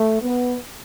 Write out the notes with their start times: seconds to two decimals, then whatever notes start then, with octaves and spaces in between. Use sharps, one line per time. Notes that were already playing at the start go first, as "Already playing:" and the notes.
Already playing: A3
0.22 B3